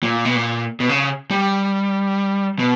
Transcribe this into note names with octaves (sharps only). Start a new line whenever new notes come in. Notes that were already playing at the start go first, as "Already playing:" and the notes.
A#2
B2
A#2
B2
C#3
G3
B2